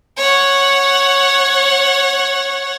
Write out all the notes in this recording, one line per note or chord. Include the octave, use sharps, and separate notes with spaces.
C#5 F#5